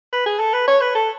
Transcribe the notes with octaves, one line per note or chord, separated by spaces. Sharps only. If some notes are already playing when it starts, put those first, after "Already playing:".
B4
G#4
A4
B4
C#5
B4
A4